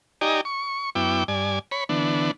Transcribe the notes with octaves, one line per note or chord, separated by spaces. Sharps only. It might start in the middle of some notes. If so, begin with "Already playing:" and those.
D#4 G4 D5 D#5 G#5 A#5
C#6
F#2 B3 E4 G5 D6
G2 D5 G#5
C#5 B5
D3 E3 B3 D4